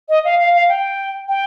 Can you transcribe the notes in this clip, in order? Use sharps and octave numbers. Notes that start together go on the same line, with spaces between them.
D#5
F5
F5
F5
G5
G5